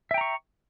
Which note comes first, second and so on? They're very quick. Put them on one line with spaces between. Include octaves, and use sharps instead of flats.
E5 G5 A#5 C#6